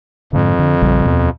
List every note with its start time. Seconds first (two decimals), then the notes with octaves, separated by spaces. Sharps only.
0.33 F2 G#2 D3
0.59 D3
0.82 A#1 C#3 G3
1.05 D#2 B2 B3